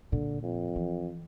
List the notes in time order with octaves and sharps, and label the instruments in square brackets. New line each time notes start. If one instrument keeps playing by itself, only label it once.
[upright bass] A#2 [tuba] D3
[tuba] F2
[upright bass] E3